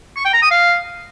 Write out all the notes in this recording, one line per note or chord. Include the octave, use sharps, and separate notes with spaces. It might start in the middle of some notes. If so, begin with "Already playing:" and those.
C#6
G5
A#5
D#6
F5